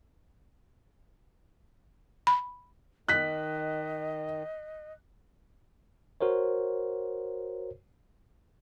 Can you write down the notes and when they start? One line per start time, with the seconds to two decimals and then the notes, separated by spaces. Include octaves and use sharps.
2.27 B5
3.08 D#3 D#5 F#6 B6
6.21 F#4 A#4 C5 C#5